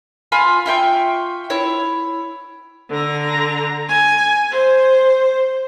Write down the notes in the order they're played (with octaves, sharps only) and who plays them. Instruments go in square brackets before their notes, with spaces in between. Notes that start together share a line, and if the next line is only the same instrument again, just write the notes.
[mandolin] F4 G#5 B5
F4 E5 G5 C#6
E4 C#5
[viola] D3 A#5
G#5
C5